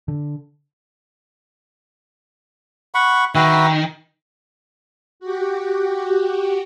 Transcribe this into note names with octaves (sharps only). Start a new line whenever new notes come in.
D3
F#5 B5 C#6
D#3 F#4 B4 E5
F#4 G4